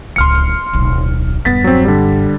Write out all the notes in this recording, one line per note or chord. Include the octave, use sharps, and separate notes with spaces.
D1 C#2 C6 F6 C#7
D1 B1
E1 G2 B3 A6 B6
F#3 C4
D3 G3